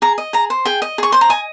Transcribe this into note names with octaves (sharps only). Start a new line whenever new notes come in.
G#4 A#5
D#5
G#4 A#5
C5
G#4 G5
D#5
G#4 C#6
C5 C6
A#5
D#5 G#5